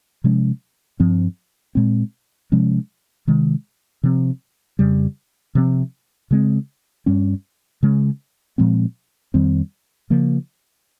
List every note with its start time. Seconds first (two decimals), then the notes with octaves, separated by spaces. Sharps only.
0.24 C3 F3 G#3 C#4
1.00 G2 F3 C4
1.75 A#2 G#3 C4
2.52 C3 F3 G#3 C#4
3.27 C3 D#3 G#3
4.03 C3 F3 C4
4.79 F2 C#3 G3
5.55 C3 F3 G#3 C4
6.31 C#3 G#3 C4
7.06 G2 G3 C#4
7.83 C#3 G#3 C#4
8.58 A#2 F3 G#3 C4
9.34 F2 D#3 G3 C4
10.10 C#3 F3 A#3